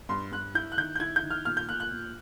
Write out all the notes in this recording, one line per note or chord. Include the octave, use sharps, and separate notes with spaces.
G2 C6
G2 F#6
E4 G6
F#6
D#3 G6
G6
E4 G#6
G6
D#3
F6
A#2 F6
G6
A#2 F#6
F#6
A#2